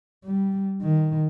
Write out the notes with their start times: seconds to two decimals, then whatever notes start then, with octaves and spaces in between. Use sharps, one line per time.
0.25 G3
0.82 D#3